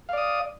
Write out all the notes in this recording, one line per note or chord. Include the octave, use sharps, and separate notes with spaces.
D5 F5 D#6